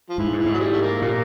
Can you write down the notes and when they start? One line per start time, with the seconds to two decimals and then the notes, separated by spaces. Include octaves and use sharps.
0.10 F3
0.18 G#2 E3
0.32 G#2
0.39 E3
0.46 G#2
0.54 F#3
0.60 E3 G3
0.72 A3
0.82 A#3
1.02 A#2 F3 G3 A#3